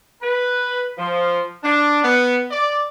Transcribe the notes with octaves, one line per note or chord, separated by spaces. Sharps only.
B4
F3
D4
B3
D5